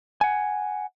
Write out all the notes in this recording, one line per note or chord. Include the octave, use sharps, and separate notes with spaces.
F#5 G#5